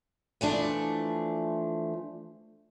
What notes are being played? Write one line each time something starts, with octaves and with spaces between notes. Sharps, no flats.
E3 F3 A3 D4